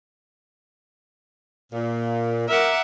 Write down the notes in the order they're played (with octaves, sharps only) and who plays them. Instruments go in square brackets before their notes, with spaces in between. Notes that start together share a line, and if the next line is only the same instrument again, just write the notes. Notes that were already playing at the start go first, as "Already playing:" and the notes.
[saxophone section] A#2
[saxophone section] A#4 [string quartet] E5 F#5 D6